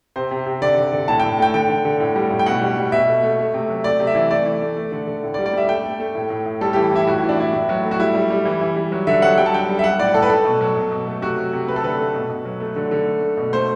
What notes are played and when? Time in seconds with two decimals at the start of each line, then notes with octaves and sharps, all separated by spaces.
0.16 C3 C5
0.31 C3
0.46 C3
0.62 D3 D5
0.78 D3
0.93 D3
1.08 A2 A5
1.20 A2 G5
1.39 A3 G5
1.54 D3 G5
1.69 D3
1.85 D3
2.00 A2
2.16 G3
2.31 A2
2.39 G5
2.46 B2 F#5
2.61 G3
2.77 G3
2.92 B2 E5
3.08 A3
3.23 A3
3.39 A3
3.54 C3
3.69 F#3
3.84 A3 D5
4.00 C3
4.07 E5
4.15 E3
4.31 A3 D5
4.46 E3
4.61 A3
4.77 A3
4.92 D3
5.07 D3
5.23 A2
5.34 D5
5.38 G3
5.46 D5
5.53 G3 E5
5.69 A3 G5
5.84 A3
6.00 A3
6.15 A2
6.30 A2
6.46 A2
6.61 G3 A4
6.73 E3 G4
6.92 E3 E4
7.07 A2 F#4
7.18 E3 E4
7.29 D4
7.38 A2 E4
7.53 A2
7.69 F#3
7.84 A3
7.91 F#4
7.99 G3 E4
8.15 G3
8.30 G3
8.45 E3
8.61 E3
8.76 G3
8.92 F#3
9.07 D3 E5
9.22 F#3 F#5
9.38 G3 G5
9.46 A5
9.53 D3 G5
9.69 G3
9.79 E5
9.84 G3 F#5
9.99 A2 D5
10.14 A2 A4
10.22 B4
10.30 A3 A4
10.45 B2
10.61 F#3
10.76 B2
10.91 B2
11.07 A3
11.22 C3 F#4
11.38 F#3
11.53 C3
11.68 A3 B4
11.76 A4
11.83 D3 B4
11.99 A3
12.14 B2
12.29 B2
12.45 F#3
12.60 A3
12.76 D3
12.91 D3
13.07 A3
13.22 A3
13.37 B2
13.53 A3 C5